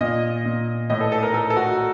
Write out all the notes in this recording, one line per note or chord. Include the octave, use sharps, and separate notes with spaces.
A#2 D#5
A#2
A2 D#5
A4
A4
A#4
A2 A4
A4
F#4